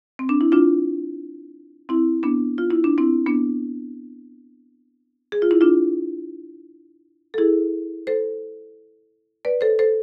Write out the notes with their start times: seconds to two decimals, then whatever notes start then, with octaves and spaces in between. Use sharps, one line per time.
0.19 C4
0.29 D4
0.41 E4
0.52 D4 F4
1.89 C4 E4
2.23 B3 D4
2.58 F4
2.71 E4
2.84 D4
2.98 C4 E4
3.26 B3 D4
5.32 G#4
5.42 F4
5.51 E4
5.61 D4 F4
7.34 A4
7.38 E4 G#4
8.07 A4 C5
9.45 B4 D5
9.61 A4 C5
9.79 A4 C5